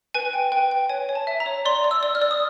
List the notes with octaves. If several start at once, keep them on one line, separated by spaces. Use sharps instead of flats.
B4 G#5
G5
B4 G5
G5
C#5 G#5
C#5
A5
E5
A#5
C#5
D5 C6
D5
E6
D5
F6
D5
D#6